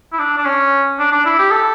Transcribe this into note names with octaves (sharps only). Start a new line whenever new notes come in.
E4
D4
D4
C#4
D4
D4
E4
G4
A4